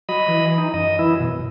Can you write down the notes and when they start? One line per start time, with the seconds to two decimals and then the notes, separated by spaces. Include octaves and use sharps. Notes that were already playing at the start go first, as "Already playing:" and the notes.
0.09 F#3 D#5 B5
0.28 E3
0.58 D#4
0.74 F#2 D#5
0.99 E3 E4
1.20 B2